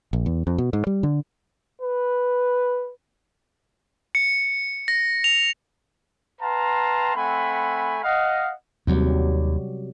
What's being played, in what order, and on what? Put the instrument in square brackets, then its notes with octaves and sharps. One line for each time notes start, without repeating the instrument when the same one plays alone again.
[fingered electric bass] A#1
E2
F2
B2
G#2
G3
D3
[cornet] B4
[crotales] C#7
A#6
F7
[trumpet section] B4 F5 G5 A5 A#5 C6
A3 C4 F#5 G#5 B5
D#5 F5 F#5
[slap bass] D#2 [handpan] C3 F#3 G3